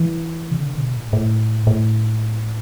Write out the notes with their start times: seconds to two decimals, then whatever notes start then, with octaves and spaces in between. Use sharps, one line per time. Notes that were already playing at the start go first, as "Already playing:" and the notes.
Already playing: E3
0.51 C3
0.60 D3
0.77 B2
0.96 A2
1.13 A2
1.67 A2